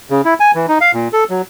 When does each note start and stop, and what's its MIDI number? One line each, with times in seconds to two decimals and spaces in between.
0.10 0.22 49
0.25 0.34 64
0.40 0.51 80
0.55 0.66 52
0.68 0.78 63
0.81 0.92 77
0.93 1.08 46
1.13 1.24 69
1.30 1.42 54